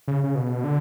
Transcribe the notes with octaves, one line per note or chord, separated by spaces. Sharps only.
C#3
C#3
B2
D3